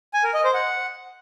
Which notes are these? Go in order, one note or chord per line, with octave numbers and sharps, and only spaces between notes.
G#5
A#4
D#5
C5
F#5